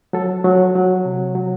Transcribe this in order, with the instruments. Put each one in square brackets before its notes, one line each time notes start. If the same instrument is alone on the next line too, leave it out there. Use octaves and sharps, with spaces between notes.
[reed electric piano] F#3 A4
F#3
F#3
C3
F#3